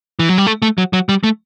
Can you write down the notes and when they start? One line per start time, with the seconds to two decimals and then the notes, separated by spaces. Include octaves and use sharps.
0.19 E3
0.29 F#3
0.38 G3
0.47 A3
0.62 A3
0.78 F#3
0.93 F#3
1.09 G3
1.24 A3